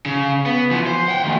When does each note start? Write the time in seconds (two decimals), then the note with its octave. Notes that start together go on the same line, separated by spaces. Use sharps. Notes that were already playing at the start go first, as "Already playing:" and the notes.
0.06 C#3
0.46 B3
0.71 E3 F3
0.86 C5
1.08 F#5 G5
1.23 D#3 A3